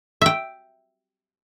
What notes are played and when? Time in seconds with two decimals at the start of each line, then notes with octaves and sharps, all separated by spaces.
0.22 E5 G5